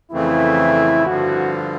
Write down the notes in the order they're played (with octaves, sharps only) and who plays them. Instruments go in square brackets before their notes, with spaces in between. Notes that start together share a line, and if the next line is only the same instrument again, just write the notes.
[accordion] F2 C#3 E3 A3 C4 [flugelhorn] E4
[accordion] G2 D3 F3 [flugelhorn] F#4